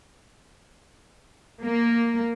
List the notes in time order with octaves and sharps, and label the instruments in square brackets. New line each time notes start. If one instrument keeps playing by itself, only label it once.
[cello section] A#3